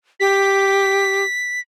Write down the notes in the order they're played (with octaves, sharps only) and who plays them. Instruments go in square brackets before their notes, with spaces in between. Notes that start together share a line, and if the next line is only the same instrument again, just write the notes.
[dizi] G4 [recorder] B6